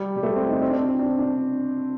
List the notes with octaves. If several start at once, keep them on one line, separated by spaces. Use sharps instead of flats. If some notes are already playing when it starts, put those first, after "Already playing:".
Already playing: G3
G3
A3
C4
D#4
C4
D4
C4
D4
D4